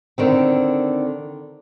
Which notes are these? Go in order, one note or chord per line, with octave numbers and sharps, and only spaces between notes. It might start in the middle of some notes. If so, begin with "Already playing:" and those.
D3 D#3 C4